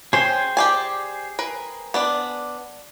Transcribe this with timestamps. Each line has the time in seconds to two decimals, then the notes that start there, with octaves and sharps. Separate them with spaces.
0.13 C#4 G#4 C5 G5
0.57 G4 D5 G#5
1.39 A#4 B4
1.94 B3 D4 D5